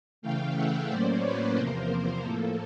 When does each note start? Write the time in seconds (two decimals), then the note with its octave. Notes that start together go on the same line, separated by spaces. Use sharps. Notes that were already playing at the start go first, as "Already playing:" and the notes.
0.22 C#3 E3 A3 F5 G5
0.55 E5 F#5
0.88 A2 F#3 A#3 C#4 C5 D5
1.23 B4 C#5
1.56 E2 C3 F3 A#3 A#4 C5
1.89 A#4
2.22 A2 F3 A#3 A4